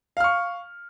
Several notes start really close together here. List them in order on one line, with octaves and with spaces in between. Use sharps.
F5 F6 C#6